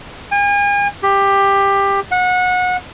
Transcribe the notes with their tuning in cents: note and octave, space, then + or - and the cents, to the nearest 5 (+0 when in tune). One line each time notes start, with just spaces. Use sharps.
G#5 -40
G4 +15
F#5 -25